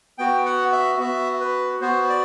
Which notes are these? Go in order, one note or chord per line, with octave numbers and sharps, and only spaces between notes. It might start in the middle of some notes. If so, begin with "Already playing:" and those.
B3 F#4 G5
F#5
E5
B3 F#4 E5
B4
B3 F#4 C5
D5